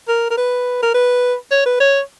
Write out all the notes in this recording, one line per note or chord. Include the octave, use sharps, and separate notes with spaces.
A#4
A#4
B4
A#4
B4
C#5
B4
C#5